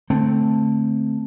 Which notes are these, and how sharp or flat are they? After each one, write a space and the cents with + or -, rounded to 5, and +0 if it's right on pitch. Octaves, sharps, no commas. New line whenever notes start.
D3 +0 A3 +0 C4 +0